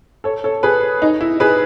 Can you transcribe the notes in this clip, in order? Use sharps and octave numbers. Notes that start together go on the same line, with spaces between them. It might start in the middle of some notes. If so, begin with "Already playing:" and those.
A4 C#5
A4 C#5
G#4 B4
D#4
E4
G#4 B4